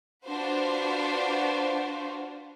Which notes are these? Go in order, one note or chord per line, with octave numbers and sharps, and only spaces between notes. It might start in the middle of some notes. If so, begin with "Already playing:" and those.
D4 F4 F#4 B4 C5